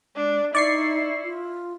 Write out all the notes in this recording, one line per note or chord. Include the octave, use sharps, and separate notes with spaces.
G#3 D4
D#4 E4 D5 C#6 C7
F4